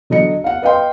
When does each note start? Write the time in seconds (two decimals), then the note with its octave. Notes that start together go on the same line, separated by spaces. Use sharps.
0.10 D3 F#3 D#5 C#7
0.44 F5 F#5
0.62 B4 D#5 F5 G5 C6